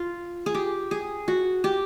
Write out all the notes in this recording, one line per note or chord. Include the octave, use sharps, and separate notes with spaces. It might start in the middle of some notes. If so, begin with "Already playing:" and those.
Already playing: F4
G#4
G4
G#4
F#4
G4